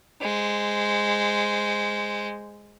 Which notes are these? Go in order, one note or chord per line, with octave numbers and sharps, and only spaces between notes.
G#3 C5